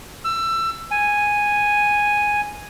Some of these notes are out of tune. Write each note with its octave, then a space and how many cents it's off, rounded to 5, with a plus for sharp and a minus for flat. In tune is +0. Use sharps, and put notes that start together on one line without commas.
E6 +20
G#5 -5